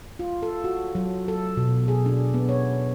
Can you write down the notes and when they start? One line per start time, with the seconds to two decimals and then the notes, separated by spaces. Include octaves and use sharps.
0.19 F4
0.43 A4
0.64 F#4
0.95 F#3
1.28 A4
1.57 B2
1.88 G#4
2.06 D4
2.34 B3
2.49 C#5